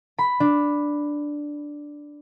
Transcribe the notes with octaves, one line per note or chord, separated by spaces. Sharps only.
B5
D4